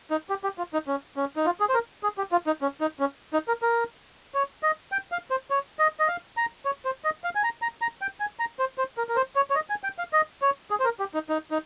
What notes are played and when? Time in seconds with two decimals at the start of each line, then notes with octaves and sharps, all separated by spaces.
0.11 D#4
0.29 G4
0.44 G4
0.58 F4
0.73 D#4
0.87 C#4
1.16 C#4
1.36 D#4
1.46 F4
1.60 G#4
1.69 C5
1.74 A#4
2.03 G#4
2.18 G4
2.32 F4
2.47 D#4
2.62 C#4
2.81 D#4
3.00 C#4
3.33 D#4
3.48 A#4
3.62 A#4
4.34 C#5
4.63 D#5
4.92 G5
5.12 F5
5.30 C5
5.50 C#5
5.79 D#5
6.00 D#5
6.08 F5
6.37 A#5
6.65 C#5
6.85 C5
7.04 D#5
7.24 F5
7.35 G#5
7.44 A#5
7.62 A#5
7.81 A#5
8.01 G5
8.20 G#5
8.39 A#5
8.59 C5
8.78 C5
8.97 A#4
9.09 A#4
9.16 C5
9.36 C#5
9.50 C#5
9.55 D#5
9.70 G#5
9.84 G5
9.98 F5
10.13 D#5
10.42 C#5
10.71 G#4
10.80 C5
10.85 A#4
11.00 G4
11.14 D#4
11.29 D#4
11.51 D#4